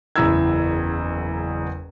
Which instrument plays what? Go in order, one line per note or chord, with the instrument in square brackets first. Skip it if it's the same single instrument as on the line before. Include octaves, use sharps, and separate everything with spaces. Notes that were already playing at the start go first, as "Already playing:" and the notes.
[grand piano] F#1 E2 E4 A#5 E6 G#6